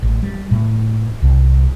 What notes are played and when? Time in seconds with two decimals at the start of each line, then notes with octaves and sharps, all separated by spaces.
0.02 A1
0.23 G3
0.51 A2
1.22 C2